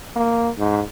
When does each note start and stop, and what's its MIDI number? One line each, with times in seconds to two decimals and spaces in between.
0.16 0.49 58
0.58 0.81 44